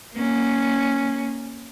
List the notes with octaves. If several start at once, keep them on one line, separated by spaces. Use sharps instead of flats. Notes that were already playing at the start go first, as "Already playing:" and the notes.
A#3 C#4